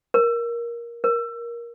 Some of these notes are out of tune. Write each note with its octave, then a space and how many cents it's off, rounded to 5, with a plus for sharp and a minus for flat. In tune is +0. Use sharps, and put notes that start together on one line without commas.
A#4 +15
A#4 +15